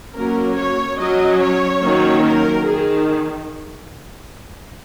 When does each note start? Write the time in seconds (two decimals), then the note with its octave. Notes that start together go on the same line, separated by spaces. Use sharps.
0.14 F#3 A#3 C#4 A#4
0.57 C#5
0.99 F#3 C#4 D#5
1.41 C#5
1.83 D#3 F#3 A#3 C#4
2.25 A#4
2.67 D#3 G#4